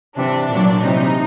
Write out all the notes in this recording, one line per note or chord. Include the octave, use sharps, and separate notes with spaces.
C3 E3 D4
A#2 F#3
C3 E3 D#4